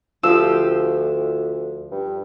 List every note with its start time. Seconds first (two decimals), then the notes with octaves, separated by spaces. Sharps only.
0.23 D2 F3 G4 E6
1.91 G2